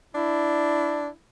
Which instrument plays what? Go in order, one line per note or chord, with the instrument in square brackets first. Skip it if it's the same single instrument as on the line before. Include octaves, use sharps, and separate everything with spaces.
[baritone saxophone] D4 [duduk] E4